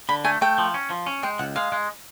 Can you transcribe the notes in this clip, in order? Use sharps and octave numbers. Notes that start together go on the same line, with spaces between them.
D3 B5
A3 G#5
A3 G5
F3
C#4
F3
C#4
G#3 G5
C#2 F#5
G#3 F5
G#3